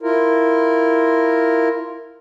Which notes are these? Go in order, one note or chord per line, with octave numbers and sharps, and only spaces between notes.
E4 F4 A#4